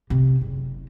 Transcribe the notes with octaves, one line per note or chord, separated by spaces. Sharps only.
C3
F#1